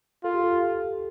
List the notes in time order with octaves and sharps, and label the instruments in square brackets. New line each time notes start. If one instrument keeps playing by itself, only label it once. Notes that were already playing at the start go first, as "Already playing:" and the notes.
[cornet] F4 [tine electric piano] A4
[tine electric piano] G4
A4